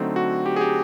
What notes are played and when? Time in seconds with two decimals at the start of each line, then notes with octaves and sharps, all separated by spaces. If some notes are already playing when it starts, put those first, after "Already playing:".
Already playing: D3 F#3 A3 C4 D#4
0.16 F#4
0.46 G4
0.56 G#4
0.61 G4